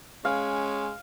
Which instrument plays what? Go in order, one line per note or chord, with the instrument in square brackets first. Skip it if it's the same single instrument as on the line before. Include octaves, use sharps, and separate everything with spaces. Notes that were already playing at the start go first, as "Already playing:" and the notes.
[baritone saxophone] G#3 [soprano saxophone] C#4 [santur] F5